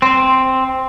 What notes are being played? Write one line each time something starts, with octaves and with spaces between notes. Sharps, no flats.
C4